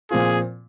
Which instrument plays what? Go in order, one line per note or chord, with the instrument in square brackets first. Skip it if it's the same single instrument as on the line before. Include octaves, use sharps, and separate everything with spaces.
[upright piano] A#2 F3 C4 F4 [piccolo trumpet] G#4